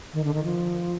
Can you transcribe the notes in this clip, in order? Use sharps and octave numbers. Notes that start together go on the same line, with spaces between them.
D#3
D3
D#3
F3